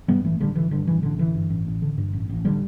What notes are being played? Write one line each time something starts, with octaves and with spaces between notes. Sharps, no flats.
G2 G3 B3
A1 E3 A3
A1 D3 G3
D3 E3
G2 D3
A1 E3
A1 D3
D3 E3
G2
A1
A1
D3
G2
A1
A1
D3 G3